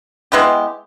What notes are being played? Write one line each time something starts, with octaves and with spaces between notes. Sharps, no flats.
G#3 B3 E4 G4